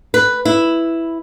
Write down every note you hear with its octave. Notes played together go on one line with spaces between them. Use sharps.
B4
E4